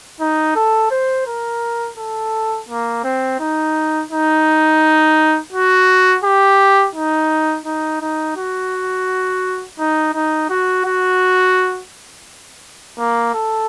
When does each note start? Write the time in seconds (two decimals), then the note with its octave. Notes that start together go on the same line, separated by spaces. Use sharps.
0.20 D#4
0.56 A4
0.91 C5
1.26 A#4
1.98 A4
2.69 A#3
3.04 C4
3.40 D#4
4.11 D#4
5.53 F#4
6.24 G4
6.95 D#4
7.66 D#4
8.01 D#4
8.37 F#4
9.79 D#4
10.14 D#4
10.50 F#4
10.85 F#4
12.98 A#3
13.34 A4